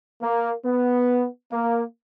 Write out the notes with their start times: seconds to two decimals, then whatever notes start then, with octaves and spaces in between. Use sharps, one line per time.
0.22 A#3
0.65 B3
1.52 A#3